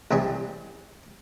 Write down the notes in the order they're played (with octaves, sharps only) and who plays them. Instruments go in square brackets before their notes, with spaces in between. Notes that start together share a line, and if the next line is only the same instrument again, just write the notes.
[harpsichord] C2 E3 G3 C4 G#4 D5